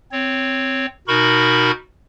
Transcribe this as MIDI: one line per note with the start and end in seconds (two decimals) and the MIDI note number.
0.12 0.86 60
0.12 0.86 73
1.08 1.71 47
1.08 1.71 63
1.08 1.71 66
1.08 1.71 70
1.08 1.71 83
1.08 1.71 85